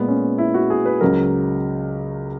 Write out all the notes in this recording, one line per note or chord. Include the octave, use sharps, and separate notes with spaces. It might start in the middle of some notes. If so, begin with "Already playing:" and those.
Already playing: A#2 G#3 B3
C#4
E4
F#4
G#4
B4
C#2 C#3 F#3 A#4